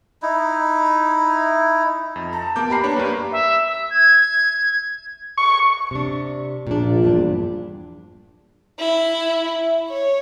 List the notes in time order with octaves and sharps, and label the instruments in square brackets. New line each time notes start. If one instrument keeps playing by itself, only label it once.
[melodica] D#4 E4
[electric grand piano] F2
[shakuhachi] A5 [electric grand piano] A#5
[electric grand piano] A#3 D6 G6 [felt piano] B3
[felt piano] G4 A#5 C7 [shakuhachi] B5
[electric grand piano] D4 C#5 [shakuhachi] B4
[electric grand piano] G2 G3 A#3
[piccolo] E5
E6
G#6
[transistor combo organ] C#6
[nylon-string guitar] C3 D4
[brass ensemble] A#1 [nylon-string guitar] A#2 D4
[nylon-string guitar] E2 G2 D4
[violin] E4
C#5